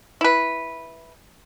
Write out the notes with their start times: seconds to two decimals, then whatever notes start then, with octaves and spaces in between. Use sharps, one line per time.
0.21 E4 B4